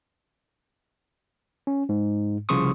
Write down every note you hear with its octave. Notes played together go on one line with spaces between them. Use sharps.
C#4
G#2
C2 C#3 F3 C6 C#6 D#6